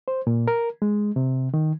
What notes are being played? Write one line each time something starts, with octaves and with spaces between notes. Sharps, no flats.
C5
A#2
A#4
G#3
C3
D#3